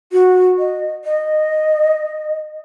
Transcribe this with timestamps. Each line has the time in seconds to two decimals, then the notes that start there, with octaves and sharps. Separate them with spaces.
0.12 F#4
0.59 D#5
1.05 D#5